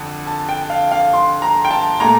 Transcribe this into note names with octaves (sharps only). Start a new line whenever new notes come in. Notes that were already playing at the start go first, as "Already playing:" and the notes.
Already playing: F2 D3
A5
G5
F5
F5
C6
A#5
G5
A5
A#2 A3 A#5